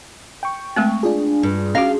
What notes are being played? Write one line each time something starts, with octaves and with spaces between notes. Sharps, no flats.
G5 C#6
G#3 A3 C4
D4 F4 G#4
G2
C#4 F#4 F5